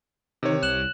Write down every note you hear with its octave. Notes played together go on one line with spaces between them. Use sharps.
C3 D#3 C#5
C2 F#6 E7 F#7